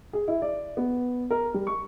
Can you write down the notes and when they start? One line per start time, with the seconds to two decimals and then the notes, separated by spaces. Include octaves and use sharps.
0.13 G#4
0.28 E4
0.42 D5
0.77 B3
1.31 A#4
1.54 G3
1.67 C#6